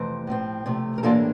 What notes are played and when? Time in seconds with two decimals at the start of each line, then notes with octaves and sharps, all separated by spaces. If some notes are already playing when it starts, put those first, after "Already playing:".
Already playing: F2 C3 E3 A3 C4
0.27 A2 F3 C4
0.66 C3 F3 A3
0.98 A#4
1.03 A2 E3 A#3 D4 F4 A4